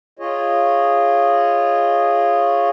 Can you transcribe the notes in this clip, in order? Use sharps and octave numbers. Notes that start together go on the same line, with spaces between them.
F4 G#4 C#5 D#5